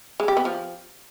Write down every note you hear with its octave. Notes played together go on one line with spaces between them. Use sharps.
G#3
G4
B3
F3